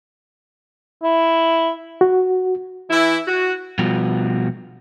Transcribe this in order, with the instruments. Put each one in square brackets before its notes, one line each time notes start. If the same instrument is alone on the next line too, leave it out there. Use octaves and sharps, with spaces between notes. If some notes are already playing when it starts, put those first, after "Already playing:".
[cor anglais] E4
[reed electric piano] F#4
[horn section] E3 E4
F#4
[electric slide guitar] B2 F3 G3 B3 F4 F#4